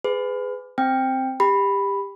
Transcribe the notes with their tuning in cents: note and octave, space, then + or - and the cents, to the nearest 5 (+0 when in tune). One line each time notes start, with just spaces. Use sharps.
G#4 +0 B4 +30
C4 +0 G5 +10
G4 +20 B5 +0